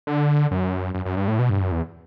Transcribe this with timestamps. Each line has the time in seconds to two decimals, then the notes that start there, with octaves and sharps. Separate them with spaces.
0.07 D3
0.51 F#2
0.94 F#2
1.05 F#2
1.17 G2
1.28 A2
1.39 B2
1.50 G2
1.61 F#2
1.72 E2